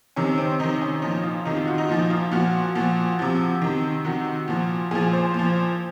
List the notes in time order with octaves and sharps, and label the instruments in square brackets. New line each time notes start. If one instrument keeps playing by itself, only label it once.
[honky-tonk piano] C3 D#3 C#4
C4
C3 D#3 D#4
C#4
A#2 F3 D#4
F4
C3 D#3 D#4
F4
F#4
D#4
A#2 F3 D#4
F4
A#2 F3 F#4
A#2 F3
C3 F3
C3 D#3
C3 D#3 F#4
A#2 F3
A#2 F3 G#4
C5
A#2 F3